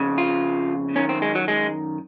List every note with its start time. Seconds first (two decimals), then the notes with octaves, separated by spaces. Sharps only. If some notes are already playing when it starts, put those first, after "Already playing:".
Already playing: F2 C#3
0.18 F4
0.95 F#2 D#3 C#4
1.09 C4
1.22 G#3
1.35 F#3
1.48 G#3